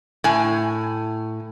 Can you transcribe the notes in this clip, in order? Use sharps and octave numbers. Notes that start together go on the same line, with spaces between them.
A2 G#5